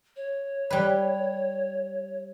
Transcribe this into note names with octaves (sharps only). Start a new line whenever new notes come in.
C#5
G3 B4